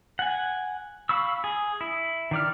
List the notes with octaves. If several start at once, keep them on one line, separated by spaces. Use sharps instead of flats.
F#5 G#5
F5 B5 C#6 E6
G#4
E4
D#3 D5 F6